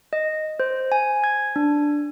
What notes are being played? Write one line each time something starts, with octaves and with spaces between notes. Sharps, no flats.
D#5
C5
G#5
G#6
D4